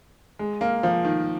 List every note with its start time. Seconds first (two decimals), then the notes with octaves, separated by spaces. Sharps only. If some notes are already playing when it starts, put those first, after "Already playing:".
0.39 G#3
0.61 A#3
0.83 F3
1.05 D#3